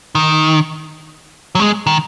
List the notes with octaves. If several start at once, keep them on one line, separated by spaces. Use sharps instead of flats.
D#3
F#3
G#3
D#3